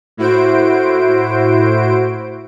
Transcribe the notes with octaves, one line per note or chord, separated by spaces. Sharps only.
A2 E4 F#4 C5 D7